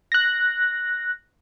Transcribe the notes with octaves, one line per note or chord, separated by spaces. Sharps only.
F#6 A#6